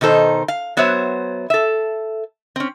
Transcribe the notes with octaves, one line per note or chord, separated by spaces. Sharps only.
B2 D#3 D#4 A4 C5
F5
F#3 B3 C5 C#5 E5
A4 E5
C4 C#4